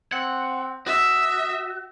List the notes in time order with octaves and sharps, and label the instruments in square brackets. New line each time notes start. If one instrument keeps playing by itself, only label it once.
[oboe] C4 [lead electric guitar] F#5
[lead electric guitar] F#4 [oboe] D#5 [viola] E5